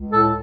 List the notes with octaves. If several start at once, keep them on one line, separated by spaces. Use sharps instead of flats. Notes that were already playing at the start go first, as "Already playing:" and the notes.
Already playing: C#2
A2 A4